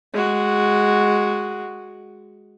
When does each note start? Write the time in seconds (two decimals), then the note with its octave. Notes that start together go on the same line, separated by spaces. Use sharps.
0.13 G#3 F#4